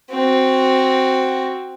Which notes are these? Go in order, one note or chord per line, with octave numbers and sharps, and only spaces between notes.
C4 F#4